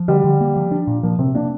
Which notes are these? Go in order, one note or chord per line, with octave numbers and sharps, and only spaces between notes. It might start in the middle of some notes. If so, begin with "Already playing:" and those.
Already playing: F3
D3 G3
D3
A#3
F3
D4
A#2
F3 A#3
C3 C4
A#3 D4